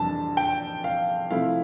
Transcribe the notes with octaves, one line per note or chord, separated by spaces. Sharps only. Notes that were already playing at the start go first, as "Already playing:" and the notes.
Already playing: F2 C3 E3 G3 D4 A5
G5
F5
C3 F3 A3 E4 F5